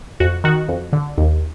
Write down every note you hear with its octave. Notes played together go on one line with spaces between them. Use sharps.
F2 F#4
D#3 F#4
F2
D3
D#2